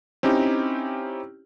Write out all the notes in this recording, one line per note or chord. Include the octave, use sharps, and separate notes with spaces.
C4 C#4 D#4 E4 G4